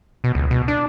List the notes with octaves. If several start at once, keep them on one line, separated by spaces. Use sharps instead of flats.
B2
C#2
B2
D4